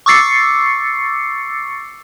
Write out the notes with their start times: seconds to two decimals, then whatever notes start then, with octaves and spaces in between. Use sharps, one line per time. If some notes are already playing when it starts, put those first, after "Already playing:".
0.06 C#6 D6 E6 A6 C7 C#7